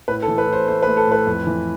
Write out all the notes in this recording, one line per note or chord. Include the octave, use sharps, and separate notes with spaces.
A2 B4
A4
E3
B4
A2
C5
A3 C5
B4
A3
A4
A2
B4
F2
E3